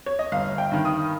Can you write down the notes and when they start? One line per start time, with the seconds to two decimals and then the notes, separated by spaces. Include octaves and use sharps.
0.06 C#5
0.19 D#5
0.32 G1 F5
0.58 G5
0.71 G2 D#3
0.85 D#6